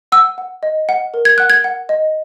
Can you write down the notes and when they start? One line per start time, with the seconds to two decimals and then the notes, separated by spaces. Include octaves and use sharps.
0.12 F#5 E6
0.38 F#5
0.63 D#5
0.89 F#5
1.14 A#4
1.25 G#6
1.38 F#5 F#6
1.50 G#6
1.64 F#5
1.89 D#5